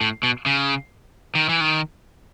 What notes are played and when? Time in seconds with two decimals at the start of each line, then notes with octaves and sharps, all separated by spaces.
0.01 A2
0.23 B2
0.46 C#3
1.35 D#3
1.49 E3
1.61 D#3